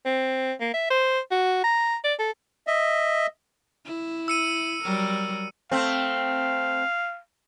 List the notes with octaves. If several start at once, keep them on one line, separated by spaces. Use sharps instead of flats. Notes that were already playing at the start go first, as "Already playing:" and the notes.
C4
A#3
E5
C5
F#4
A#5
D5
A4
D#5 E5
E4
E6 C#7 D#7
F#3 G3 A#4
A3 C4 F5